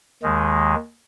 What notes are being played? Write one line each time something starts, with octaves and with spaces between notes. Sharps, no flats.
D#2 D#3 G#3